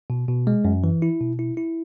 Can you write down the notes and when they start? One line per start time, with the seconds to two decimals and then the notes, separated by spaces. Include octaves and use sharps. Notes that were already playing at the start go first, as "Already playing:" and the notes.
0.10 B2
0.28 B2
0.47 G#3
0.65 F#2
0.84 E3
1.02 E4
1.20 B2
1.39 E4
1.57 E4